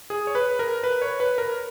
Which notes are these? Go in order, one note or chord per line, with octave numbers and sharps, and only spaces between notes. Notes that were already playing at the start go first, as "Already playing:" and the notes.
G#4
C#5
B4
A#4
B4
C#5
B4
A#4